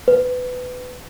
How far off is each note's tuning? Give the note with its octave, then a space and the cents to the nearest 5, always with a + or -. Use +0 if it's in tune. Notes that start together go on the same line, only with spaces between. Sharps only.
B4 +20